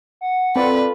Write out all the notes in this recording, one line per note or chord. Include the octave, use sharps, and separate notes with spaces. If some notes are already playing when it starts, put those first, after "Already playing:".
F#5
C4 F4 A4 B4 D5